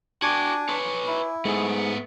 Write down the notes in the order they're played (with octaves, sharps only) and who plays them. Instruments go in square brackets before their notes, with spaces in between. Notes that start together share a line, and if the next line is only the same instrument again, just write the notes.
[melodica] D4 [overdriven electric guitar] F#4 G5 [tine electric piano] G#5 D6 G#6
[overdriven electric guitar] B4 C#5
[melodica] E4
[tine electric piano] G#2 G#4 [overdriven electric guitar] A3 B3